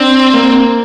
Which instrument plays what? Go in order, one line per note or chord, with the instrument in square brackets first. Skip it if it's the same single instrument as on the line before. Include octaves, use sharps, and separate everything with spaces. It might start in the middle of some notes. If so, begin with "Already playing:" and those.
Already playing: [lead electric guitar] C4 [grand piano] D4
[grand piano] A#3